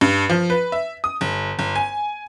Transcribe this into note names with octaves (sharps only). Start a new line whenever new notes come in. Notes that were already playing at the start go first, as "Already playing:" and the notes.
G2
F3
B4
E5
D#6
G1
G1
G#5